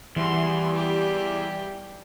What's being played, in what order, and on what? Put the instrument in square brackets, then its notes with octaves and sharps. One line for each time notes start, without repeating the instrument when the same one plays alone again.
[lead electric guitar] E2 [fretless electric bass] E3 [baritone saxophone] G3 [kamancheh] C6
[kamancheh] G4